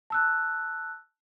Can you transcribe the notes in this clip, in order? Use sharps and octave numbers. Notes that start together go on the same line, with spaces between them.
A5 E6 F#6